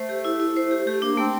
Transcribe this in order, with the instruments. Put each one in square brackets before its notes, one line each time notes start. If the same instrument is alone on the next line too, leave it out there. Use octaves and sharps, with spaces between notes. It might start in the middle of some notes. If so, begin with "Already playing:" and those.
Already playing: [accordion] A3 [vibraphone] C5
[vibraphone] G4
E4
E4
C5
G4
[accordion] A3 [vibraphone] G4
[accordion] A#3 [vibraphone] D4
[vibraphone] A3 [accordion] C4